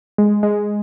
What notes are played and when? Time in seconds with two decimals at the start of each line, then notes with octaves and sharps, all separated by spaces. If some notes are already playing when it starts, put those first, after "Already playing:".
0.18 G#3
0.43 G#3